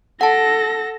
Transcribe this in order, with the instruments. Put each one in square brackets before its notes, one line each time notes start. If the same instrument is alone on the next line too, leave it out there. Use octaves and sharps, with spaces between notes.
[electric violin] A4 A#6 [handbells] F#5 A5